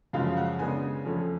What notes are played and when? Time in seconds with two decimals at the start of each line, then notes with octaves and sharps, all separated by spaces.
0.13 F#2 C#3 F3 G#3 F5
0.37 F#5
0.59 C#3 G#3 B3 D4 G#5
1.05 F2 F3 A3 C#4